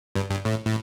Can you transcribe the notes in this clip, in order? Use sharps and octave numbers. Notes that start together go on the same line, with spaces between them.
G2
G2
A2
A2